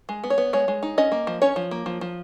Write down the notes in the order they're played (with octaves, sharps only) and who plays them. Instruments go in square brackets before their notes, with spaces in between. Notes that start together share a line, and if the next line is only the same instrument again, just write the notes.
[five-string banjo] G#3
B3
C#5
B3
G#3 C#5
G#3
D#4
C#4 D#5
A#3
F3
C#4 C#5
F3
A#3
F3
F3